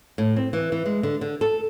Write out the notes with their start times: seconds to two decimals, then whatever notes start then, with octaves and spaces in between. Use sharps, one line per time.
0.18 A2
0.36 C4
0.53 E3
0.72 E3
0.86 G#3
1.03 D3
1.21 D3
1.41 A4